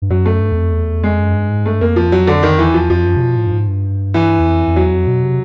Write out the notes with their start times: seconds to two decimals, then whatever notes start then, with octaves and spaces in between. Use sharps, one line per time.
0.02 G2
0.10 F#2 F#3
0.26 A3
0.41 G2
0.52 E2
0.56 F2
0.72 E2
1.03 F2 G#3
1.19 F#2
1.35 G2
1.50 G#2
1.65 G2 A3
1.81 F2 A#3
1.96 F3
2.12 F#3
2.27 D3
2.43 D#3
2.59 E2 E3
2.74 F3
2.90 F2 F3
3.05 F#2
3.16 C3
3.21 B2
3.37 A2
3.46 G2
3.52 G#2
3.68 G2
4.14 E3
4.40 E2
4.45 F2
4.67 F2
4.76 E2 F#3
4.92 F2
5.07 B2
5.23 C3